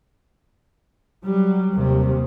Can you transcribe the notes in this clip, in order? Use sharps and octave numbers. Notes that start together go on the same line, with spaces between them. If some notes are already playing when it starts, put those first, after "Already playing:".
F#3 G3
D#2 C3